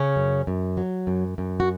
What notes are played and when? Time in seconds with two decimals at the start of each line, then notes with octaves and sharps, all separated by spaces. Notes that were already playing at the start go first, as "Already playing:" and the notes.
Already playing: C#3 C#4
0.16 F#2
0.47 F#2
0.77 F#3
1.07 F#2
1.38 F#2
1.60 F#4